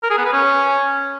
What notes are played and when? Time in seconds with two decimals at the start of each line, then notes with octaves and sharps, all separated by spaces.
0.03 A#4
0.10 G#4
0.18 B3
0.25 B4
0.33 C#4